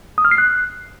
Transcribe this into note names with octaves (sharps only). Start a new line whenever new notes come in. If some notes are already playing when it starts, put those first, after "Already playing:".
D#6
F6
C7
F#6